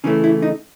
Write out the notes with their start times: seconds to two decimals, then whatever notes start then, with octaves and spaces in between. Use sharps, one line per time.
0.04 C#3 E3 A3 C#4
0.24 E4
0.42 D#4